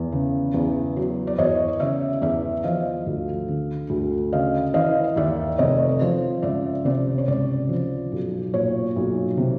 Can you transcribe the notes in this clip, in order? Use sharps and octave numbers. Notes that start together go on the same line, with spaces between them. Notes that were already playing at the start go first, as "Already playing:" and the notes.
Already playing: E2
C#3
E2
F#3
D5
E2 C#5 D#5
C#3 D5 E5
E2 D5 E5
F3 D#5 F5
D2
D3
D2
C#3 D#5 F5
E3 D#5 F5
D#2 D5 E5
F1 C#5 D#5
F3
C#2 D5 E5
C3 D5
C#5
C#2 D5
F3
B1
A#2 C#5
B1
C3